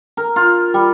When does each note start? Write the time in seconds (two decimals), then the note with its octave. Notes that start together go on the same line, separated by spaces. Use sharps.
0.17 A#4
0.36 F4
0.74 G3